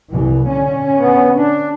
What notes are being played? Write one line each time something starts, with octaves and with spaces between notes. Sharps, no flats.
C2 E3
D3 C#4
B3
D4